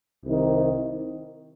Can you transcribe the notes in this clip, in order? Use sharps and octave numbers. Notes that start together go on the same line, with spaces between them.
C2 C3 D#3